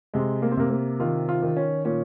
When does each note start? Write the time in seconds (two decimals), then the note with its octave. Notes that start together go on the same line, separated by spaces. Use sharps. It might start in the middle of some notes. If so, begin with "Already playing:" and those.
0.14 C3 G#3
0.42 A#3
0.51 C4
0.57 C3 A#3
0.71 A#3
1.00 D#3 F4
1.29 F4
1.43 D#3
1.57 C#4
1.85 A#2 C#4